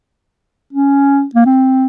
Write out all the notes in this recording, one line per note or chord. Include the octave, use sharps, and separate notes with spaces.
C#4
A#3
C4